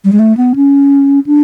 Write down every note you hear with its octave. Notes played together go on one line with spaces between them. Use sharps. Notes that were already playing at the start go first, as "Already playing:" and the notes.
G3
G#3
A3
B3
C#4
D4